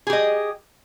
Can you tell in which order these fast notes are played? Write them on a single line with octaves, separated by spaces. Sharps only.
G#4 G4 D#5